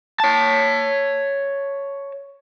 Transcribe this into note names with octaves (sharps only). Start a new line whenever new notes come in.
C#5 A5